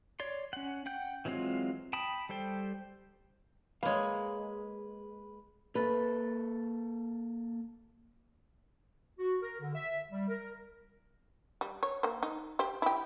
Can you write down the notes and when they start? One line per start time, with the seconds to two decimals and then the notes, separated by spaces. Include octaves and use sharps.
0.20 C#5 D5 C6
0.53 C#4 F#5
0.86 F#5 G5 G6
1.25 E3 F#3 G#3 C4 F4
1.93 G5 A5 B5 D#6
2.29 G3 A4 C5 G5
3.83 G#3 A#3 B4 C#5 F5
5.75 A#3 A4 B4
9.19 F#4
9.42 A#4
9.61 D3
9.74 E5
10.10 G3
10.29 A#4
11.61 G3
11.83 C#5
12.03 A#3 C5
12.23 D#4
12.59 G4 C5
12.82 E4 G4